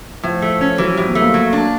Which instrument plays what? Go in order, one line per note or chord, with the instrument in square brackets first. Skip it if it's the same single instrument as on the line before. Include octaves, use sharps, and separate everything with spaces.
[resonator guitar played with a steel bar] A2 [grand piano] F3
[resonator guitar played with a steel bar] A3
C#4
[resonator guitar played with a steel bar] E3 [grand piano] F#3
[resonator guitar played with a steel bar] A2 [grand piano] G3
[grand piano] B3
[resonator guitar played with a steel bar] A3
[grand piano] A#3
[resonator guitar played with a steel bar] F#3
D4